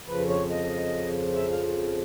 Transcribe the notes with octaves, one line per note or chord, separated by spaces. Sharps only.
F2 C#3 F3 B4
C#5
D#5
E5
F5